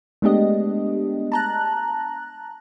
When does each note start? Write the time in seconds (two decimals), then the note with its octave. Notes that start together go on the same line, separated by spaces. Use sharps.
0.22 G#3 A3 B3 D4 G4 D#5
1.32 A5 A#5 F#6